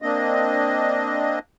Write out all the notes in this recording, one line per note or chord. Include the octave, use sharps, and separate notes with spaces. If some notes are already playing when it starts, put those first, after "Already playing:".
A#3 C4 D4 D#5